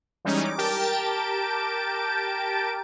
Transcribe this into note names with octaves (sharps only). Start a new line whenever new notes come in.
E3 G3 G#3 C#4 D#4
D6
G4 A#4 G5 A5 A6 D7